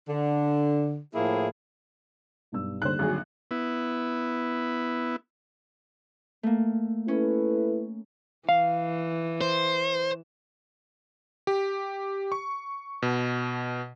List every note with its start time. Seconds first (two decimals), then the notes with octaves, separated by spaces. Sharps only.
0.08 D3
1.14 A2 F3 A#3 E4 G#4
2.52 B1 G2 E6
2.82 D#2 D3 G3 C5 F#6
2.99 G#1 F#3 G#4
3.51 B3 E4
6.43 A3 A#3
7.08 C#4 E4 A4 B4
8.49 E3 F5
9.41 C5
11.47 G4
12.32 C#6
13.02 B2